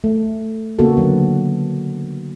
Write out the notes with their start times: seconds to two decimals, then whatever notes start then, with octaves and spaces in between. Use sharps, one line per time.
0.04 A3
0.79 C#3 A#3 B3 F#4 A4
0.97 D3 F#3 B3